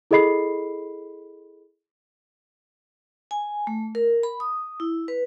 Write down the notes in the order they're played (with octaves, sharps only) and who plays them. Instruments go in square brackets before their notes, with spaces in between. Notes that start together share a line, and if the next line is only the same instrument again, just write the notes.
[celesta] E4 G#4 A4 D#5 B5 C7
[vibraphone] G#5
A3
A#4
B5
D#6
E4
B4